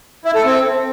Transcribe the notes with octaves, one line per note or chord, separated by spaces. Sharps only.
E4
A4
C4